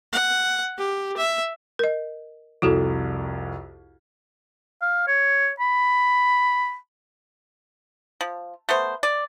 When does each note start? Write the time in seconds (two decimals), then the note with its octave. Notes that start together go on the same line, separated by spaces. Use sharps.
0.13 F#5
0.78 G4
1.17 E5
1.79 A#4 D#5
2.62 C2 F2 E4 F#4 A4
4.81 F5
5.07 C#5
5.60 B5
8.21 F3
8.69 A3 B3 C5
9.03 D5